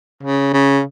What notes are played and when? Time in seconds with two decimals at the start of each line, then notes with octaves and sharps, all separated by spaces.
0.23 C#3
0.54 C#3